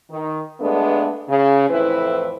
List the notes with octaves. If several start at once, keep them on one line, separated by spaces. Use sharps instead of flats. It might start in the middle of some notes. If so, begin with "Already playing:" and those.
D#3
G2 G#3 A3 B3 D4
C#3
F2 A2 E3 C4 E4 B4